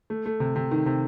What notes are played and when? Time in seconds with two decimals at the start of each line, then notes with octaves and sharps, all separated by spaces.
0.10 A3
0.26 A3
0.40 C3
0.56 C3
0.71 D#3
0.86 C3